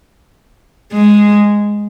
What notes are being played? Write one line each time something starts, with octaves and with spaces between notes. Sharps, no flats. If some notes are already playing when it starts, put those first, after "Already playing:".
G#3